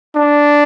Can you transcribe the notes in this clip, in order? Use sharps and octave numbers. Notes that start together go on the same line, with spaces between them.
D4